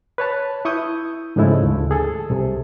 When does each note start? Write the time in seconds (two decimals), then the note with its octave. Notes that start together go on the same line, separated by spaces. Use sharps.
0.18 B4 C#5 A5
0.65 E4 C#6 D#6 G6
1.36 G#2 C#3 F3 G#3 A3 E4
1.63 D2
1.91 G#4 A4
2.30 C2 C3